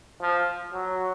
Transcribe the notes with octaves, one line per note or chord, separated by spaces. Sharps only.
F3
F#3